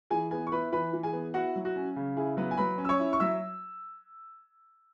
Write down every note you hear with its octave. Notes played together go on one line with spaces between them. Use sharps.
E3 G#4 G#5
B3 G#4 G#5
C#6
E4 B4 B5
E3 B4 B5
E3
G#4 G#5
B3
E4 F#4 F#5
F#3
F#4
C#4
C#3
E4 G#4
F#3 B3 B4
G#5
F#3 B4 B5
C#4
E6
C#5 C#6
E4
C#6
F#3 E5 E6